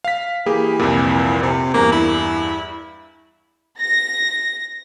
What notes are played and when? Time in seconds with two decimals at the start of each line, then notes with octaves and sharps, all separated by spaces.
0.04 F5 B6
0.46 E3 A#3 G4 G#4
0.79 C2 F2 A#2
1.43 C3
1.74 E2 G2 A#3
1.92 E4
3.79 A#6